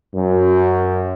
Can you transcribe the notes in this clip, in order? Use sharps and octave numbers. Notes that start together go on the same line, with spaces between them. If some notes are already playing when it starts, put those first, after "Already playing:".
F#2